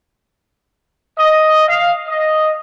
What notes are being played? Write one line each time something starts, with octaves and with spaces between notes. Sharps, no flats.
D#5
F5
D#5